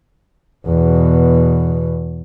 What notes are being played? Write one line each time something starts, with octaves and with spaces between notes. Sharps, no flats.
E2 B2